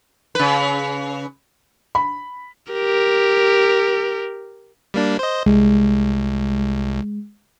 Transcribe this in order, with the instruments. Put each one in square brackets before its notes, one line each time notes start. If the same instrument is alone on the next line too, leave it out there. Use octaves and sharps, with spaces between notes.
[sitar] C#3 B4
[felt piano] B5
[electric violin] G4 A#4
[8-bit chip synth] G3 A#3 D4
C5 D#5
[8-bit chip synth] C2 [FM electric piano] G#3